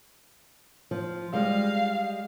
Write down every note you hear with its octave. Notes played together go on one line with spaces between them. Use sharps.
F3
G3 G#3 F5